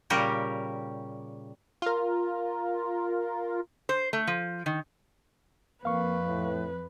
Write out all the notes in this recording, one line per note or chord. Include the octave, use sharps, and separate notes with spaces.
A#2 C#3 G3 G4 A#4 C#5
F4 A#4
C5
A3
F3
D#3
F2 A#3 B4 F5 C#6
A2